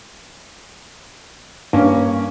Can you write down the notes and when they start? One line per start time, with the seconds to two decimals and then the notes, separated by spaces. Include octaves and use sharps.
1.73 G2 A#3 C#4